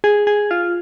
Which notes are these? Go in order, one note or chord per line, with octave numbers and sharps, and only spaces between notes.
G#4
G#4
F4